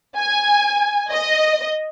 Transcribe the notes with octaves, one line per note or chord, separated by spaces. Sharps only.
G#5
D#5